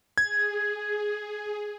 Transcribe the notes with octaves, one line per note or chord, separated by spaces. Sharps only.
G#4 G#6